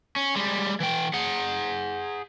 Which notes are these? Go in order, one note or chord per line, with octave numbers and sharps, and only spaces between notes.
C#4
G3 G#3
E3 G5
G#4 F#5